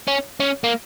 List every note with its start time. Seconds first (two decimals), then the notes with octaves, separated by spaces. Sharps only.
0.08 C#4
0.40 C#4
0.64 A#3